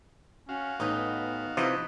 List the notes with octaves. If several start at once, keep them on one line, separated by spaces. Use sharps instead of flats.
C#4 F#4 F5
A1 B3 D#4 B4 D#5
C3 E3 F3 B4 D#5